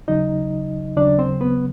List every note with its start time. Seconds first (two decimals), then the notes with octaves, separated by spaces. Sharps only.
0.08 D#2 C#3 F#3 D#4 D#5
0.97 D#2 C#3 F#3 D4 D5
1.19 C4 C5
1.41 B3 B4